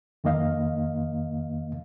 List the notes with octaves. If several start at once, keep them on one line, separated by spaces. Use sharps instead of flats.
F2 D#3 A#3 D#5 F5